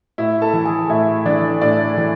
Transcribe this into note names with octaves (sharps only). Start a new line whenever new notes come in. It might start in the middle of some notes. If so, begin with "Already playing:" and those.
A2 E4 E5
A4 A5
E3
G#4 G#5
A2 E4 E5
E3 D4 D5
A2 D4 D5
E3